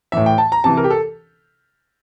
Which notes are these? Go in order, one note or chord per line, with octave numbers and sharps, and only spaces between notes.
A2 E3 E5
G5
A5
A#5
C3 E3 A5
A#4
G4
A4